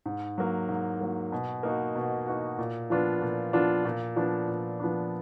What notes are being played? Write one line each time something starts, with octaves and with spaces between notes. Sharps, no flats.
G#2
F#3 A#3
G#2
F#3 A#3
B2
A#3 D#4 F#4
B2
A#3 D#4 F#4
A#2
F3 B3 D4 F4
A#2
F3 B3 D4 F4
A#2
F3 B3 D4
A#2
F3 B3 D4